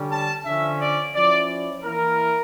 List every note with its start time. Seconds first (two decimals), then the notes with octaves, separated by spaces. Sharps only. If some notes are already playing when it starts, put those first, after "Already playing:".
Already playing: D3 G3 C#4
0.10 A5
0.45 D3 F3 C#4 E5
0.79 D5
1.14 F3 C#4 E4 D5
1.49 D5
1.83 E3 A#3 E4 A#4